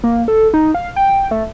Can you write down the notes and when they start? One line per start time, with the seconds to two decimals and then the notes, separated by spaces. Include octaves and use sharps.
0.04 A#3
0.28 A4
0.54 D#4
0.74 F5
0.96 G5
1.31 A3